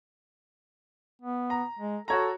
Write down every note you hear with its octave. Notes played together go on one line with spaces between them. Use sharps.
B3
A#5
G#3
F#4 A4 C#5 A#5